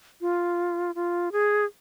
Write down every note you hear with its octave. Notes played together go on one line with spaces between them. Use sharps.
F4
F4
G#4